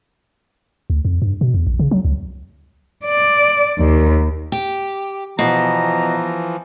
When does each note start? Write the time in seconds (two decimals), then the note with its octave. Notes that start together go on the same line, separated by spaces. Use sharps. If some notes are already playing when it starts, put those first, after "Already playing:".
0.90 D2
1.05 F2
1.22 G2
1.41 B2
1.54 E2
1.67 A#1
1.79 C#3
1.91 F#3
2.05 C#2
3.05 D5
3.78 D#2
4.52 G4
5.39 B2 E3 F3 A#5